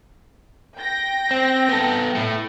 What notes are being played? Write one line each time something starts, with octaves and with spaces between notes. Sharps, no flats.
G5 A#6
C4
B3 A4
A2 A3